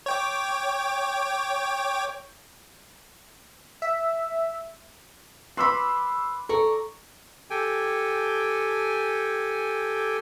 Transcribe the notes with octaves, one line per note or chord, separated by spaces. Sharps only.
C#5 G5 D6
E5
B4 B5 C6 D6 E6 C7
A4 D5 A#5 C#6
G4 A4 G5 G#5